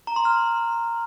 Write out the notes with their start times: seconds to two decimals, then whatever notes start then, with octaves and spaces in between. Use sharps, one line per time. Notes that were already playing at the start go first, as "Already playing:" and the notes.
0.07 A#5
0.16 C6
0.25 F6